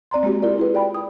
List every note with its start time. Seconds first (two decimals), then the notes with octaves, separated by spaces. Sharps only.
0.11 C4 D5 A#5 C6
0.23 G#3 A#3 C4 F#4 G4
0.42 E4 F4 A#4 D5
0.58 E4 G#4 B4
0.75 D5 G5 B5
0.94 D#6